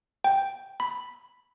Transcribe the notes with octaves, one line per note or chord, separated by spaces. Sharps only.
G5
B5